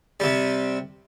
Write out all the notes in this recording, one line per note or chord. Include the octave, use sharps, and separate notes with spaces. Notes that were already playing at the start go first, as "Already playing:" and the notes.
C3 G3